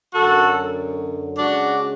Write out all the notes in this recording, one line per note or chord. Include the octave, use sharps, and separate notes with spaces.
F#2 D3 F#3 F#4 A4
C#3 G#3 D4 F#4